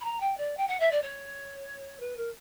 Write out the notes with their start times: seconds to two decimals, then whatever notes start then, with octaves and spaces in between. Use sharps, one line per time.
0.01 B5
0.04 A#5
0.20 G5
0.37 D5
0.57 G5
0.68 F#5
0.80 E5
0.91 D5
1.02 C#5
2.00 B4
2.17 A#4